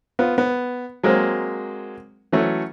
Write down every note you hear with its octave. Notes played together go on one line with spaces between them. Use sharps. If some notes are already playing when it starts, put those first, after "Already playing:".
B3 F4
B3
F#3 G#3 A#3 C4
E3 F#3 A3 C#4